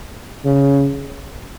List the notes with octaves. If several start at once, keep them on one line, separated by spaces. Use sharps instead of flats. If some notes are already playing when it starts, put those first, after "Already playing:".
C#3